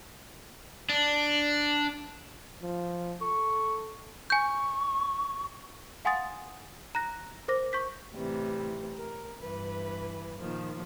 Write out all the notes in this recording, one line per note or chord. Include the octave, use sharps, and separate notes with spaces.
D4
F3
A4 C#6
G#5 C#6 G6
F5 F#5 G#5 C6 D#6 A6
A#5 F#6 A#6
A#4 C5 D6 A#6
C#6 G6 B6
A2 C3 E3 G3
A#4
G2 E3 B4
A#2 D#3 F3